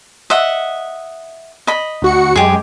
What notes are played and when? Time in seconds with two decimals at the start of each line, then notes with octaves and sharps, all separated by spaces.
0.30 D#5 E5 F#5
1.67 D#5 B5
2.02 D2 F#4 C#7
2.35 F#2 G#3 G4 G#4